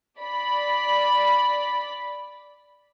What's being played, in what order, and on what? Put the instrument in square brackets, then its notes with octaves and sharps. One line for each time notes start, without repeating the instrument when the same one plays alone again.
[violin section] D5 B5